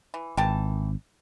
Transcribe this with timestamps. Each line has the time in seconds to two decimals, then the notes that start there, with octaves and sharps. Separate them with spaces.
0.14 E3
0.37 G#1 E3 G5 A5